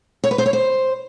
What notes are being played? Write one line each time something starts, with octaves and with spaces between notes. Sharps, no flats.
C#5
B4
C5
C#5
C5